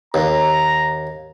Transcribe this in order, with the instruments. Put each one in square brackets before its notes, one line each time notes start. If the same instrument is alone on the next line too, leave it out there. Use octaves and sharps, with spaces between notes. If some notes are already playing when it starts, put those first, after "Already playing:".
[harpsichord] D#2 [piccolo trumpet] A#5